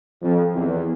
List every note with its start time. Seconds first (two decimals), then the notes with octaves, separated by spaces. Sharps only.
0.22 F2
0.55 E2